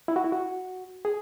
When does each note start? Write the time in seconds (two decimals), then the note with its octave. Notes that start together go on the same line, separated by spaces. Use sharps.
0.08 E4
0.16 F#4
0.24 E4
0.32 F#4
1.05 G#4